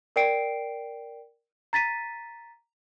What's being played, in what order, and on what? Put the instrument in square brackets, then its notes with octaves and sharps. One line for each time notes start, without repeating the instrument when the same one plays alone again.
[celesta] A#4 D5 G5 C7 D7
A#5 A6 B6 D#7